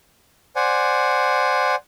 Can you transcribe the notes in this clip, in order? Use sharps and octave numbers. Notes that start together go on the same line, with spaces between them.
C5 D5 F#5 G#5